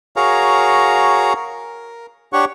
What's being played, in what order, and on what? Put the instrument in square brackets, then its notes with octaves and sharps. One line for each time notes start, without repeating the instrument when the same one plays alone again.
[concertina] F#4 G#4 A#4 C#5 F5 A#5
A#4
D4 G4 C#5 F#5 C#6